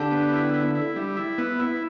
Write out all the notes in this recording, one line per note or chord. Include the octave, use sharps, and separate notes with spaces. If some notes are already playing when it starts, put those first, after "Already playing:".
Already playing: D3 D4 G4
B3
E4
E4
E4
G3
E4
B3
E4